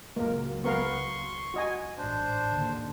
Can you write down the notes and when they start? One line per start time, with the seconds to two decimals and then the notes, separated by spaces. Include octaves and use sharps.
0.16 C#2 F#3 A#3 A#4
0.64 B3 A#4 F5 C6 C#6
1.54 F#4 D#5 G#5
1.98 A1 G#2 D4 C5
2.51 D#2 D3